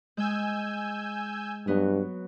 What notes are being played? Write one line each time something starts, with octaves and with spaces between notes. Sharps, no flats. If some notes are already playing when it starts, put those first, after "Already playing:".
G#3 G#5 E6 G6
G2 F#3 B3